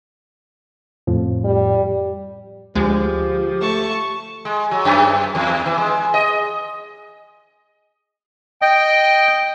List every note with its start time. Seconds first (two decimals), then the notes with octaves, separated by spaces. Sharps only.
1.07 F2 A2 F3
1.45 G3
2.75 D2 F3 G#3 G4
3.61 A3 A5 C#6
4.45 G#3
4.71 F#3
4.85 F#2
5.35 E2
5.66 E3
5.78 G#3
6.14 D#5
8.62 D#5 G5